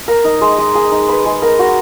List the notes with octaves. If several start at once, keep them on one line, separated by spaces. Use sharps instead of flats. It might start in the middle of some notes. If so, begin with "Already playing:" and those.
A#4
D#4
G#3
G#3
G#4
D#4
B4
G#3
A#4
F#4